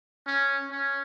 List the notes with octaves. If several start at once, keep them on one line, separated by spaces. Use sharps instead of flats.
C#4
C#4